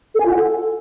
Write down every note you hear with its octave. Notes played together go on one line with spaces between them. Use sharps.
A4
G#5
F4
F#5
A4